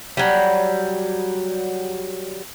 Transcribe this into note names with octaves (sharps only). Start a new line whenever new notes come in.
F#3 G3